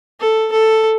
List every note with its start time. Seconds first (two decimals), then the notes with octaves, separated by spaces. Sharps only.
0.20 A4
0.52 A4